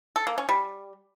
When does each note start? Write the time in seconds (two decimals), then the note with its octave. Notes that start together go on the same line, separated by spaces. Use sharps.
0.16 A4
0.27 A#3
0.38 C#4
0.49 G3